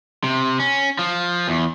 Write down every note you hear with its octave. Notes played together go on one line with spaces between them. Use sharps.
C3
C#4
F3
E2